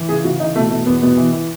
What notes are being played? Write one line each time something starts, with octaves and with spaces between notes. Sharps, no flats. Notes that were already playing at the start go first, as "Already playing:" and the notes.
Already playing: E3
C#3 G#4
C#3 F#4
E3 D#4
B2 A3
B2 A3
E2 B3
B2 B3
E3
E3